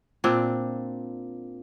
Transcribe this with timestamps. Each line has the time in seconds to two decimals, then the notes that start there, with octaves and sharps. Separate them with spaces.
0.24 A#2 C4 D4